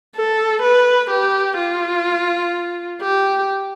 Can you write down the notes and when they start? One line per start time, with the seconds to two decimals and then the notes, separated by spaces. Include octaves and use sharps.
0.16 A4
0.62 B4
1.10 G4
1.58 F4
3.01 G4